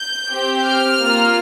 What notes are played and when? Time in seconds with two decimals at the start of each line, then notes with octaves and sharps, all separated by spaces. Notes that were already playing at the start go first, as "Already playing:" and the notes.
Already playing: G6
0.31 C4 G4
0.65 F6
1.00 A#3 F4